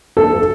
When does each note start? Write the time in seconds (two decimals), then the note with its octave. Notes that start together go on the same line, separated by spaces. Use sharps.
0.17 A4